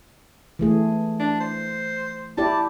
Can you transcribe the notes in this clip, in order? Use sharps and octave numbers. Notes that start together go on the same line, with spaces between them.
E3 A3 G#4
D4
C5
E4 G4 D5 A5